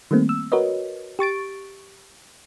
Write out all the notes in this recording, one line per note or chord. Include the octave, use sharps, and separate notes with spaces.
D#3 G3 A3 A#3 C4
E6
F#4 A#4 B4 C#5 D#5
G4 C#6 A6 D7